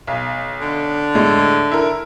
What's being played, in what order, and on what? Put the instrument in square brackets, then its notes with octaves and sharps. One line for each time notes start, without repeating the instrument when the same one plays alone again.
[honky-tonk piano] B1
[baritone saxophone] D3
[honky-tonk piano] A2 G#3
E4 A#4